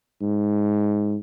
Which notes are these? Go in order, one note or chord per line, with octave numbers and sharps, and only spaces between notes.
G#2